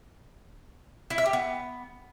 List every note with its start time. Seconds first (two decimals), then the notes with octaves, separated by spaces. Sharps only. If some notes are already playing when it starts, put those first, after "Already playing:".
1.10 E4
1.18 E5
1.26 G4
1.33 B3